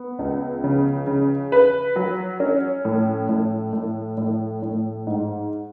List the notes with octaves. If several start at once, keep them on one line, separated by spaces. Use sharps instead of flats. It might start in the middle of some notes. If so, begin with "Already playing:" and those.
Already playing: B3
C#2
C#3
C#3
B4
F#3
C#4
A2
A2
A2
A2
A2
G#2